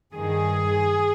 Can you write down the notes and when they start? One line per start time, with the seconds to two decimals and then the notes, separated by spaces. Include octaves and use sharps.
0.13 G2 D#3 G#4